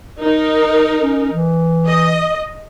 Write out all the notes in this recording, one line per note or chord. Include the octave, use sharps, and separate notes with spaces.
D#4 A#4
C#4
E3
D#5